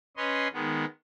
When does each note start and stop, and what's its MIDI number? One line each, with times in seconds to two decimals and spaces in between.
0.17 0.48 61
0.17 0.48 71
0.17 0.48 73
0.17 0.48 75
0.17 0.48 84
0.53 0.85 51
0.53 0.85 56
0.53 0.85 59